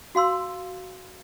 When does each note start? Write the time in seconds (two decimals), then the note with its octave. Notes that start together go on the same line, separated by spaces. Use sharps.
0.15 F#4 F5 C6 E6